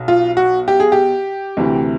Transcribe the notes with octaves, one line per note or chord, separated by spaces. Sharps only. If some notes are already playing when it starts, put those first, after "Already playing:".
Already playing: B1 B2
F4
F#4
G4
G#4
G4
D2 C3 E3